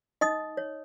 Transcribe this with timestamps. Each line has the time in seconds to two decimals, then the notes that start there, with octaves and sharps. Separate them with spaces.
0.21 D#4 D#5 D#6
0.57 C#5